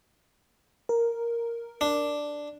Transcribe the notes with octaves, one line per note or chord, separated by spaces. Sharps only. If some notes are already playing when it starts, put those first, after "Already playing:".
A#4
D4